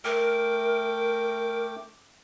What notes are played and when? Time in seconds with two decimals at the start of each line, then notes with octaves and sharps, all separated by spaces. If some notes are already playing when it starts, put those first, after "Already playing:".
0.05 A3 A#4 G5 D6